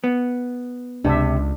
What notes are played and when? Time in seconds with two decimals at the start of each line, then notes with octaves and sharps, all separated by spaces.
0.04 B3
1.04 C#2 C3 D4 E5